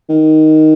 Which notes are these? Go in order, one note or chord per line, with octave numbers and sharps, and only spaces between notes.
D#3